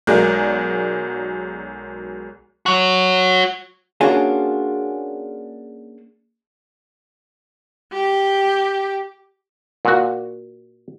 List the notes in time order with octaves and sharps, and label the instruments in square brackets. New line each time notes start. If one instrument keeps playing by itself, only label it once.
[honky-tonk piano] B1 G#3 F#4 G#4 A#4 D5
[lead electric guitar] F#4 C#5
[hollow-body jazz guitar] A#3 C#4 D4 F4 F#4 G#4
[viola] G4
[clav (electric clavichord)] A#2 F#4